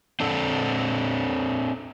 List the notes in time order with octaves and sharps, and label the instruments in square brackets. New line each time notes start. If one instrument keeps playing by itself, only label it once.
[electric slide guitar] C4 D4 A4